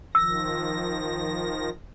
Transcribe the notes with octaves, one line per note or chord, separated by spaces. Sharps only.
D#3 F3 E6 A#6